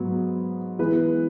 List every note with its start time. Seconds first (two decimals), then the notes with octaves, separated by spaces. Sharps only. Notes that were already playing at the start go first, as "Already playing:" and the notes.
Already playing: G#2 F#3 B3
0.79 E3 G#3 B3 E4 B4